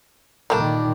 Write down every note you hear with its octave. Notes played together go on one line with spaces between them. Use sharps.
A#2 D#3 G3 A3 A#3 D4